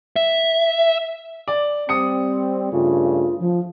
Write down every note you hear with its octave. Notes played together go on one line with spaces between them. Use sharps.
E5
D5
G3 C4 D#6 C#7
G2 C#3 A3 F4
F3